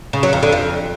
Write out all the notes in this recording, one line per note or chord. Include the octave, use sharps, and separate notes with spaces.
C#3
F#3
F2
D3
F2